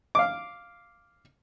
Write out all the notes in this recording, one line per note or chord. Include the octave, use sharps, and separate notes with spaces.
F5 D6